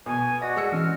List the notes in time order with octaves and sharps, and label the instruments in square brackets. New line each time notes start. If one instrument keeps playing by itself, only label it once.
[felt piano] B2 [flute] G#5
[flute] F#4 [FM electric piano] D5 D#5 A#6
[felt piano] G#3 E6 C#7
[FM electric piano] E3 C#4 [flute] F6